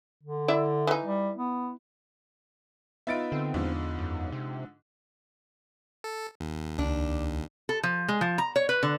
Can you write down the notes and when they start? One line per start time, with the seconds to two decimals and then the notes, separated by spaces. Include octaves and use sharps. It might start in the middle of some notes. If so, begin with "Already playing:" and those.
0.23 D3
0.48 E4 D5 E5
0.87 E3 D#4
1.05 G3
1.37 B3
3.07 B3 D#4 F4 E5 A6 D7
3.32 D3 C4
3.54 E2 G#2 D3 F3
3.99 F#2
4.32 C3
6.04 A4
6.40 D#2
6.79 C#2 D4
7.69 A4
7.83 F3
8.08 G#3
8.21 F3
8.38 A#5
8.56 C#5
8.69 B4
8.83 D3